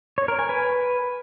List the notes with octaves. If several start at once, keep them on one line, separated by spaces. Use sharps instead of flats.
C#5
A#4
G#5
B4